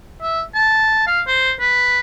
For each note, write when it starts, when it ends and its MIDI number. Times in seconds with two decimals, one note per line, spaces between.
0.21 0.41 76
0.55 1.04 81
1.07 1.21 77
1.27 1.52 72
1.60 2.00 71